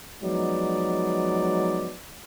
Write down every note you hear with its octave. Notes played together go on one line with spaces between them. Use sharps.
F3 F#3 G#3 B3 D#4 D5